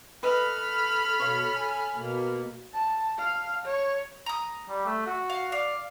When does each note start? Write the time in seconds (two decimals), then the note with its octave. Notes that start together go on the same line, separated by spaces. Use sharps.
0.23 A4 B4 D#5 B5 F6
1.20 B2 C#5 F5
1.56 G#5
1.96 B2 A#3
2.73 A5
3.19 F5
3.66 C#5
4.26 A#5 D#6
4.68 G3
4.86 A3
5.07 F#4
5.30 F5
5.52 D5 F5